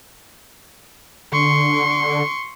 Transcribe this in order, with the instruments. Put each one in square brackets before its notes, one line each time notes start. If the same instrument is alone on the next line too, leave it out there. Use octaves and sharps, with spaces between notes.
[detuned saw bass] D3 [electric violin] C6 C#6